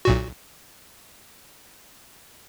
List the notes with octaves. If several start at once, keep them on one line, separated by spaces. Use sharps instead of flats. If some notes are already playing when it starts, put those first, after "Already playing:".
B1 A#2 F#4